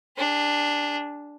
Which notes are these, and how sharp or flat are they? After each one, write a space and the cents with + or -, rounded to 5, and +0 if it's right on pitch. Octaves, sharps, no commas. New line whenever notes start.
D4 +0 G#4 -35